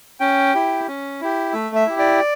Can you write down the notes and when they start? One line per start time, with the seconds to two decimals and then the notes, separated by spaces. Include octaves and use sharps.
0.20 C#4 G5
0.54 E4 G4
0.88 C#4
1.21 E4 G4
1.53 A3 E5
1.75 E5
1.86 E4 G4
1.99 D5